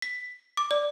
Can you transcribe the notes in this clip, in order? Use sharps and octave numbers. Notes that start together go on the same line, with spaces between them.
B6
D6
D5